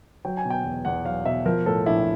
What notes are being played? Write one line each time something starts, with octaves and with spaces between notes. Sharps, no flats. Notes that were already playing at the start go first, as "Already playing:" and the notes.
F#3 G5
G#5
B2
G5
E2
E2 F#5
F#3 F5
B2 E5
F3 A#4
A2 A4
A#1 E4